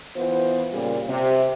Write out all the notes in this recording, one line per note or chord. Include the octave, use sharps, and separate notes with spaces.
E3 B3 F4 C5
A#2 C#3 G3
C3